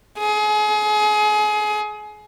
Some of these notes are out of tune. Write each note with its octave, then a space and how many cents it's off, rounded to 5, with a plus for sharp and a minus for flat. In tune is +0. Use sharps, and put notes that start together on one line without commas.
G#4 +30